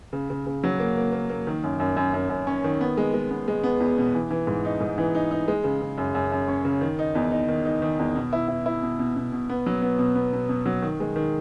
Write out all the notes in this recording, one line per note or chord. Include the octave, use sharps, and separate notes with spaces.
C#3
C#3
C#3
F#3
A#3
A#3
A#3
A#3
D#3
F#2
F#2
F#2
F#2
F#2
C#4
D#3
B3
G#3
G#3
B3
G#3
B3
E2
B2
E3
E3
G#2
D#4
G#2
E3
D#4
D#4
G#3
C#3
C#3
F#2
F#2
F#2
C#4
C#3
D#3
D#4
E2
D#4
D#3
D#4
D#3
E2
B2
E4
E4
E4
B2
B2
B2
B2
B3
F#3
B3
B2
B3
B2
B2
F#3
D#3
G#3
D#3